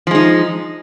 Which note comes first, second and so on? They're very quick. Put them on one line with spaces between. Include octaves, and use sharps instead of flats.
F3 G#3 D#4